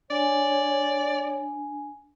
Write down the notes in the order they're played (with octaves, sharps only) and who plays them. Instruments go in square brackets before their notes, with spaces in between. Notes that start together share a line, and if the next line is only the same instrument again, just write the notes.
[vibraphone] D4 G#5 [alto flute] C#5 [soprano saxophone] D5